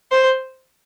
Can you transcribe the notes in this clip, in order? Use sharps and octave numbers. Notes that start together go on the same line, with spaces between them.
C5